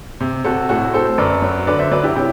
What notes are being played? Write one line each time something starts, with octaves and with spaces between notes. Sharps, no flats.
C3
C3 F#4 A4
A2 F#4 A4
C4 A4 C5
F#2 B4 D5
F#3
D3 B4 D5
C5 E5
F#3 B4 D5
E4 G4
C3 E4 G4